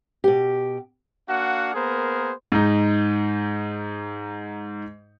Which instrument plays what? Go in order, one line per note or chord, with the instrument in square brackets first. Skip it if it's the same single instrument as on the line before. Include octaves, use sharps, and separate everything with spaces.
[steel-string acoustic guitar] B2 G4
[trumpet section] A#3 D4 F#4 F5 F#5
A#3 B3 G#4 A#4 C5
[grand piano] G#2 D#4